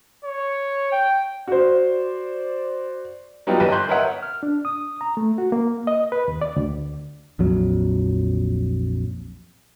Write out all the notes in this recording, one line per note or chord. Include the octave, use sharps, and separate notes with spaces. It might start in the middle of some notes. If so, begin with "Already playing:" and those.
C#5
G5
F#4 C5 D5
F#3 G3 B3 D#4 F4 G4
G1 B4 D#5
C6 F#6 G6
A#4 B4 C#5 D#5 E5 F#5
F6
D4
D#6
A#5
A3
F#4
A#3
D#5
B4
D#2
D5
D2
A#1 F2 F#3